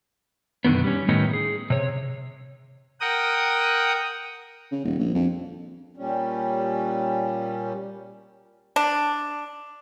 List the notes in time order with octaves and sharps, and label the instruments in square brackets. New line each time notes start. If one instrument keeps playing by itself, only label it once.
[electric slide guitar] F#2 B2 D3 D#3 B3
G3 C#4
A2 D#3 A3 B3 C#4 D#4
G#4
C3 C#5
[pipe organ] A#4 F#5 G5 D#6
[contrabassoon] C#3
D#1
A#1
F2
[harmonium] A#2 G3 C#4
[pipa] D4